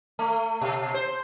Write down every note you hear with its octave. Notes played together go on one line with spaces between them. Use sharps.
A3
B2
C5